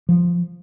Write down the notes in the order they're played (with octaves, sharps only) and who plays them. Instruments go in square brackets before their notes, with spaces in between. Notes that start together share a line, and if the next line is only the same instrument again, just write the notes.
[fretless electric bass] F3